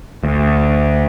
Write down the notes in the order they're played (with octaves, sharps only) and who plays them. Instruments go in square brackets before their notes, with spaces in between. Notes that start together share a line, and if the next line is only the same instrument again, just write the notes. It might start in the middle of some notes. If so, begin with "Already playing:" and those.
[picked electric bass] D2